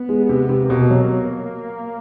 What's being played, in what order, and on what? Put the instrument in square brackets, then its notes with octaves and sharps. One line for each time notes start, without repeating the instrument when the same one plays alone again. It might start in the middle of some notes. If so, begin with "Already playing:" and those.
Already playing: [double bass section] B3
[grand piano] G#3
C3
C3
[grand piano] B2 [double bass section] A#3
[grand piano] F#3